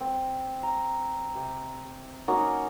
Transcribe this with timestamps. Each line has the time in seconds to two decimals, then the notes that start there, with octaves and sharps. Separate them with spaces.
0.01 C4
0.63 A#5
1.36 C3
2.28 A#3 C#4 D#4 F#4